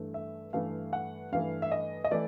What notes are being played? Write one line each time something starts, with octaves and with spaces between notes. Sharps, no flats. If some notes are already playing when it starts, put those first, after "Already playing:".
Already playing: G2 E3 A3
E5
G2 E3 A3 F5
F#5
G2 E3 A3 F5
E5
D#5
D#5
E3 A3 D5